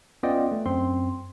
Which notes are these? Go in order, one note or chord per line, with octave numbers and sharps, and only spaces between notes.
B3 C#4 F4 D5 D#5 G5
A3
F#2 C4 C6